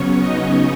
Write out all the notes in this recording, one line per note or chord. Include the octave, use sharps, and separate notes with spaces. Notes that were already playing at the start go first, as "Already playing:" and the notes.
Already playing: C#3 F#3 B3 C#4 C#5
D#4 D#5